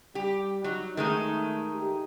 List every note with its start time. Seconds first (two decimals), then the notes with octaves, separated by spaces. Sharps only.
0.15 G3 G4
0.64 F#3 D#4
0.97 D#3 G#3 A3 D#4
1.73 G4